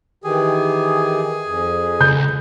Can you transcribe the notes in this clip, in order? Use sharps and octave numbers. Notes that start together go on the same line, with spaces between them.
D#3 E3 G4 G#4
F2
C#2 G6